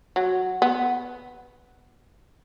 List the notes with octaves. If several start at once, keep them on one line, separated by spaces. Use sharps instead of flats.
F#3
B3